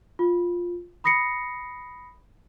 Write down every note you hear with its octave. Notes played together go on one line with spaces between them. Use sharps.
F4
B5 D#6 A#6 C7 C#7